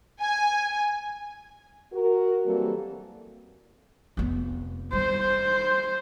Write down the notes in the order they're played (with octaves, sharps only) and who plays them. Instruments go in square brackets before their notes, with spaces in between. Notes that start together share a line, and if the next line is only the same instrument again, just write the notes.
[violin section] G#5
[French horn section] F#4 A#4
E3 F#3 G3 A#3 C4 A4
[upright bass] F1 B3
[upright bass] G3 [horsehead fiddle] C5